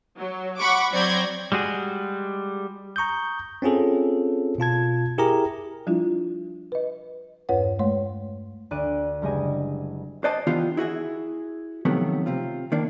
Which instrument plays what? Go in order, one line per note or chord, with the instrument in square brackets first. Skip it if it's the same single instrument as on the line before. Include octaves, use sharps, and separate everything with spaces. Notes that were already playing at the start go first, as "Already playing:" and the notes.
[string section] F#3
F#5 B5 C#6 D6
F#3 C4 D5 G6 G#6 A#6
[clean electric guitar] G3 G#3 F#4 G#4
[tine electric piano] A#5 C#6 D#6 G6
C4 C#4 F4 G#4 A4
B2 F4 A5 G#6
E4 G4 G#4 A#4 A#5
[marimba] F3 G3 D4 E4 F4
B4 D#5
E2 G2 B4 C#5 F#5
G#3 A3 C#5 C6
[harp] D2 D5 F#6 D#7
F#1 G3 G#3 D#5 G#5
[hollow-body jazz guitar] B4 C5 D5 D#5 G#5 A5
D#3 E3 B3 D4 F4 G4
E4 F#4 G#4 E5
C3 D#3 F3 F#3 A3 B3
C3 C4 F4
D#3 A#3 D4